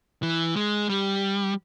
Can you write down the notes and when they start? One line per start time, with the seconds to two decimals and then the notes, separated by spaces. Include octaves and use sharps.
0.23 E3
0.56 G#3
0.89 G3